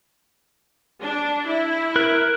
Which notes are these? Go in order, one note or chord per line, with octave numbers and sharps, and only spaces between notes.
D4
E4
A#4 F#6